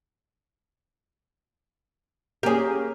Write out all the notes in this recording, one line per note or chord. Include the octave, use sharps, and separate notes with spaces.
A#3 C#4 G4 G#4